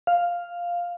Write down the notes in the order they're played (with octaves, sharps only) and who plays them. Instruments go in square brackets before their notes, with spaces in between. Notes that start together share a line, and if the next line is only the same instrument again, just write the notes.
[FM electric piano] F5